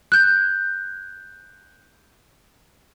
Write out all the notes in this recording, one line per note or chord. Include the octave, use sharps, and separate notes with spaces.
F#6 G6